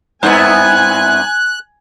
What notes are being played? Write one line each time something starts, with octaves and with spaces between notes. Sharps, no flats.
G2 B3 C4 D4 E4 G#5 F#6